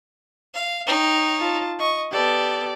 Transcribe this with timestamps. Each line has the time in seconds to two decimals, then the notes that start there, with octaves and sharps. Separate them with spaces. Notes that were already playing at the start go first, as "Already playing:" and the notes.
0.54 F5
0.87 D#4 C#5 G5
1.40 F4 A5
1.79 D#5 C#6
2.11 B3 G4 A4 D5